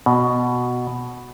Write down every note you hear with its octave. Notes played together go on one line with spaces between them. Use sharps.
B2